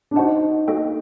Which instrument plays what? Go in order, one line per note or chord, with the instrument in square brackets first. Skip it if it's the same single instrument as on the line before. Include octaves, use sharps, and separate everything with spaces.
[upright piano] D4
[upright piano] D#4 [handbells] F#4 C5 F#5 A5
[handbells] A#3 F#4 A4 D#5 G5